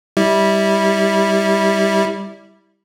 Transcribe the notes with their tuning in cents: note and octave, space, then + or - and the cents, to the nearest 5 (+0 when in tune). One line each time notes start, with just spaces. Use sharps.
G3 +0 E4 -20